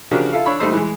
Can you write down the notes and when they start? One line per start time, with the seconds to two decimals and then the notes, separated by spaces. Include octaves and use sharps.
0.11 C#3 F3 D4 F#4 G4 A#4
0.32 E4 F4 A4 F5
0.45 D4 C#5 B5 E6
0.59 A#1 G3 A3 D#4 C5 E6
0.73 E3 G#3